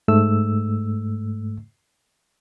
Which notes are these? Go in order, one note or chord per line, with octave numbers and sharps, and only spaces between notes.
G#2 A3 E6